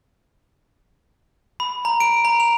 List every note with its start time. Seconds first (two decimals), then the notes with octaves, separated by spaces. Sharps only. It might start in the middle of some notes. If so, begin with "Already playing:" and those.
1.60 B5
1.85 A#5
2.00 D7
2.25 A#5
2.40 F7